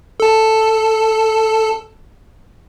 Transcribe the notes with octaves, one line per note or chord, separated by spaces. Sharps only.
A4 A5